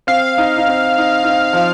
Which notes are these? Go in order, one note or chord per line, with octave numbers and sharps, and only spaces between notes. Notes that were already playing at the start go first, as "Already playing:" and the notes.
C4 F5
D#4
D#4
C4
D#4
D#4
C4
F3